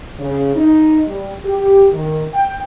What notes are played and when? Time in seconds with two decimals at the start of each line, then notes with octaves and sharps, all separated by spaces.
0.20 C#3
0.56 D#4
1.07 G3
1.45 G4
1.93 D#3
2.34 G5